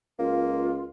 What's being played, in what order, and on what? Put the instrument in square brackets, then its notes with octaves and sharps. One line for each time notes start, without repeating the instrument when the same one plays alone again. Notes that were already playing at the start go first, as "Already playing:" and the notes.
[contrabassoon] C#2 [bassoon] A#3 [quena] F4